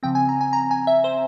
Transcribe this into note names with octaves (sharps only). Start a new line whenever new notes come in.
C#3 F3 C4 G5
G#5
A#5
G#5
A#5
G#5
E5
C5